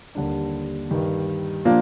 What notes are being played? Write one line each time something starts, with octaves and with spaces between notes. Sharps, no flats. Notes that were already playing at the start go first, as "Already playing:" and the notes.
D#2 D3 G3 D4
G2 D#3 G3
A#2 F3 A#3 D4